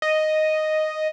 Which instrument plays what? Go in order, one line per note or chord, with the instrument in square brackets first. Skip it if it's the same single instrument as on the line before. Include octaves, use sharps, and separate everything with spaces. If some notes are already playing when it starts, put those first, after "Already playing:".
[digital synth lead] D#5